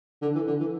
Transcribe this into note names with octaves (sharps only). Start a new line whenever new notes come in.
D3
E3
D3
E3